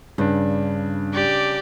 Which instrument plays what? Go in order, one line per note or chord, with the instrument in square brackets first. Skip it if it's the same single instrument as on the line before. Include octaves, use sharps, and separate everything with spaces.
[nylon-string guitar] G2 [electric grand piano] C#3 D4
[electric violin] G4 D5